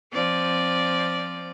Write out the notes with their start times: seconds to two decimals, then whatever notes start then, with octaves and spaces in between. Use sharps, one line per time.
0.13 F3 C4 D5